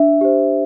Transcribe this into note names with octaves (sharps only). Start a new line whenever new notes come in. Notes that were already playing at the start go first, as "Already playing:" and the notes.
Already playing: D4 E5
G4 C5